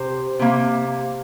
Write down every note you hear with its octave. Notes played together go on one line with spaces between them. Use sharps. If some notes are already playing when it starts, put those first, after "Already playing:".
Already playing: C3 C5
C3 A#3